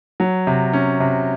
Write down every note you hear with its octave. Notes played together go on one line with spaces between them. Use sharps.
F#3
C3
C#4
C3